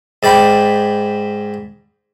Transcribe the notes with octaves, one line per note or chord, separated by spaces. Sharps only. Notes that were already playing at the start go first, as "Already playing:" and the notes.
G#2 D5 G5 B5